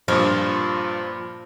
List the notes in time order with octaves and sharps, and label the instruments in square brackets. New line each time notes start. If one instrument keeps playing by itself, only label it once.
[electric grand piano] G2 A#2 [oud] F3